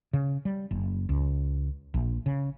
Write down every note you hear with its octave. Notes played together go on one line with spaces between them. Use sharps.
C#3
G3
F#1
C#2
A#1
C#3